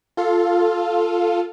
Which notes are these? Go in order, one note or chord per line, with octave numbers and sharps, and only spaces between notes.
F4 A4 F5